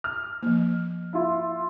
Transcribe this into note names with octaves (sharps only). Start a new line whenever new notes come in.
F6
F3 A#3
E4 F4